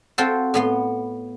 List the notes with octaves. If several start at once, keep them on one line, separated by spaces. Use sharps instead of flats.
C4 F4 F#4 A4 C5
A2 B3 C6